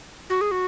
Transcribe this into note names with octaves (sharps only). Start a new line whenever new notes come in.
F#4
G#4
F#4